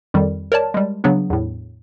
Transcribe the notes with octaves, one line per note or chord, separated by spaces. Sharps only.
F2 D#3 G3
A#4 C#5 D5 A5
G3 G#3
C#3 F#3 B3 D4
E2 A2